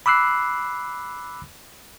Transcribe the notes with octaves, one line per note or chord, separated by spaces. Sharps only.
B5 D6 E6 F#6 C7